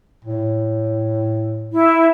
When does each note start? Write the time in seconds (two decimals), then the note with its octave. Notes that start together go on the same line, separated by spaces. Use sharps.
0.25 A2
1.72 E4